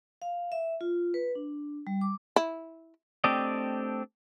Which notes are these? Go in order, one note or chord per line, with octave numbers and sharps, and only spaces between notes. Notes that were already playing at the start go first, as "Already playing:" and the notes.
F5
E5
F4
B4
D4
G3
D6
E4
A3 C4 D4 G4 D5 D#5